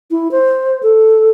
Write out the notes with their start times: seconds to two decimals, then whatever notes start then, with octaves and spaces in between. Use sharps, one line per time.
0.11 E4
0.31 C5
0.83 A4